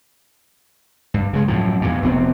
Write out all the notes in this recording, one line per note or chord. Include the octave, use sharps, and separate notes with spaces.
G2
C#3 G#3
F#2 A2 F3
E2 G2 A#2
F1 C3 B3 C4